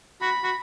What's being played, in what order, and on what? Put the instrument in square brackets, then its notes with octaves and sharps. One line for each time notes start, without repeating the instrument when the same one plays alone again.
[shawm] F#4 [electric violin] B5
[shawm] F#4